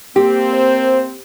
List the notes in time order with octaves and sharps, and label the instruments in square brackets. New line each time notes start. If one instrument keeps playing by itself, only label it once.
[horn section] A#3 C4 [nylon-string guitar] G4
[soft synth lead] C5